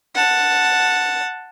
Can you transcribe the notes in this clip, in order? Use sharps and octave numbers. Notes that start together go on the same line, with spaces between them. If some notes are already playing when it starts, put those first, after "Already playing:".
F#5 A5